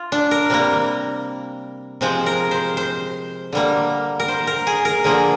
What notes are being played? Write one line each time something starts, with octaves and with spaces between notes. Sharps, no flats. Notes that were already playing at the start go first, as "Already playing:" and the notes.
Already playing: F4
D4
A#4
C3 G3 A#3
C3 F3 G#3 C5
A#4
C5
C5
D3 G3 A#3
A#4
C5
A#4
G#4
A#4
D3 F3 A#3 G#4